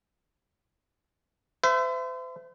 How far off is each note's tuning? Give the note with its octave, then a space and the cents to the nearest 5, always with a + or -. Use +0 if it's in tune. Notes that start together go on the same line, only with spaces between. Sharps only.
C5 -40 E5 +20